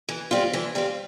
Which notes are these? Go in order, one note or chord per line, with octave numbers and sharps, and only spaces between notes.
E3
G3 C4 F4
E3
G3 C4 F4